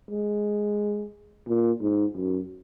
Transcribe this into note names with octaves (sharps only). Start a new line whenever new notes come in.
G#3
A#2
G#2
F#2